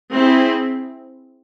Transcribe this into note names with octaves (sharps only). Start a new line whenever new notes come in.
C4 E4 G#4